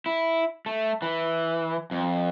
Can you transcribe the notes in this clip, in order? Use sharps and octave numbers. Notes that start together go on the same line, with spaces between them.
E4
A3
E3
F2